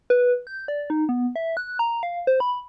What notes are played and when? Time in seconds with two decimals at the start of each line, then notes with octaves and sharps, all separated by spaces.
0.10 B4
0.47 G6
0.68 D5
0.90 D#4
1.09 B3
1.36 E5
1.57 F#6
1.79 A#5
2.03 F5
2.27 C5
2.40 B5